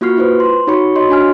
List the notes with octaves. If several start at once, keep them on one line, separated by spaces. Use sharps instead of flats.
A#3 F4 F#4 C#6 F6 C7
E4 F4 B4 C5
C6
D#4 F#4 C#5 B5 C#6
F#4 C#5 D#5 C6
D4 F#4 G#5 F6